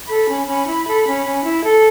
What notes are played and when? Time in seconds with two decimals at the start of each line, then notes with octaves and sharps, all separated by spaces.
0.07 A4 B5
0.28 C#4
0.47 C#4
0.66 E4
0.86 A4
1.06 C#4
1.26 C#4
1.44 E4
1.65 A4